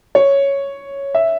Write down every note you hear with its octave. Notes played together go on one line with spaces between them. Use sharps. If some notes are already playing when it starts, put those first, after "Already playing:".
C#5
E5